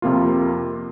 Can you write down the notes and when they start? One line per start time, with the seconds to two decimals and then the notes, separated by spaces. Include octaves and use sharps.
0.02 F2 C3 A#3 F4